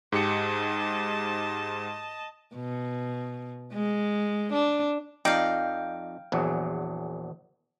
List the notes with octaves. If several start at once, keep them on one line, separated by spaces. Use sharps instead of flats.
G#2 G4 D#5 A5 C#7
B2
G#3
D4
F2 D#4 D5 F5 G5
A#1 E2 F#3